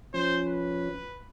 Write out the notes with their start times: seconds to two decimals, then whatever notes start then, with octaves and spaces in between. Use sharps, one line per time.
0.14 F3 C#4 C5
0.46 B4